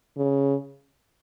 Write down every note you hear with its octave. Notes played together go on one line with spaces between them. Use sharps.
C#3